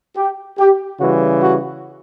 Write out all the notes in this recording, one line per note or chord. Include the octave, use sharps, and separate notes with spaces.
G4
G4
C#3 E3 G3 F#4
F#4